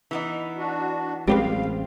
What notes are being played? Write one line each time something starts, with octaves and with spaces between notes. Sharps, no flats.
E3 B3 D#4
D4 F#4
A1 G3 G#3 C4 G4 B4 F5